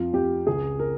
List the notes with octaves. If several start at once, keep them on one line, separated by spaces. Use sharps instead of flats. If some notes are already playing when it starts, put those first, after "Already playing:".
Already playing: F2 F4
F2 G4
C#2 G#4
A#4